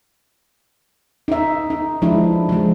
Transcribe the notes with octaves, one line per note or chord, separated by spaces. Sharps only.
D#4 E5
D#4
F3 G#3 D4 E4
F3 G#3